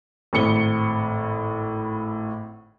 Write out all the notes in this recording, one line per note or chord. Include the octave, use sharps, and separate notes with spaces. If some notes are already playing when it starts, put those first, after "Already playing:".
G#1 A2 C#7 G7